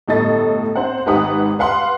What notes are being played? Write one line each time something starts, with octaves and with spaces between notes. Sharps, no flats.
G1 A2 A4 D#5 A6
C4 C5 F#5
G#1 G#2 G4 B4 F#5 D#6
B4 F5 F#5 C6